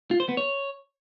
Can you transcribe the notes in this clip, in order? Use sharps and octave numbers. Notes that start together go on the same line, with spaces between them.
F4
C5
B3
C#5